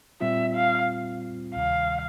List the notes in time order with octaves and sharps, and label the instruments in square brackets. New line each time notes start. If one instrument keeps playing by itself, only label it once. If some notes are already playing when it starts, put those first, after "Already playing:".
[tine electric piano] A#2 G3 C4 F4 [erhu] E5
[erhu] F5
[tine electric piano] D2 C3 D#3 G3 [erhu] F5